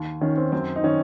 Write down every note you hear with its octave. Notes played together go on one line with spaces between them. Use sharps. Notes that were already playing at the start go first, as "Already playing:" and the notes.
Already playing: D#2
D#3 C#4
C4
F#2 C4
D#4
D#3 C#4